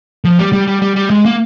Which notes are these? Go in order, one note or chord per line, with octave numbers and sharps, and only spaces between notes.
F3
G3
G3
G3
G3
G3
G#3
A#3